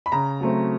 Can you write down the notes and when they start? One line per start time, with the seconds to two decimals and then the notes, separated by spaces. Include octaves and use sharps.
0.06 B5
0.12 C#3 A#5
0.40 F#3 A3 C4